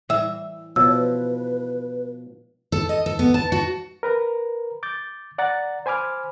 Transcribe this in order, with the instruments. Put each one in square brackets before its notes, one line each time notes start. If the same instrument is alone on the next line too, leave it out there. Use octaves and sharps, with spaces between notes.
[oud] E3 E5
[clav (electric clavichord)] B2 F3 [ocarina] C#5 [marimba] E6
[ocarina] B4
[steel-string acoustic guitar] A4
D#5
A4
B3
A5
F#4
[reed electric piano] A#4 B4 A#5
D6 G6 A6
D5 F#5 A#5 A6
C5 G#5 B5 D6 F6